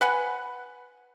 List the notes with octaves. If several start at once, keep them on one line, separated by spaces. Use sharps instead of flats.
B4 F#5 G#5